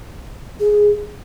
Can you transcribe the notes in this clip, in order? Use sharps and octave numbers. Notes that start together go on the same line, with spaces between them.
G#4